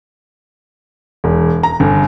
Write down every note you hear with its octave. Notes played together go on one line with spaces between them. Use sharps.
E1
A#5
G1